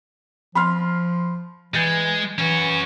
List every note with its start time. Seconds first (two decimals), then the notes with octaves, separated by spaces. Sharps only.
0.55 F3 B5 C6 F6
1.74 E3 G#3 G6 A6 C#7
2.38 E3 C#4 F#4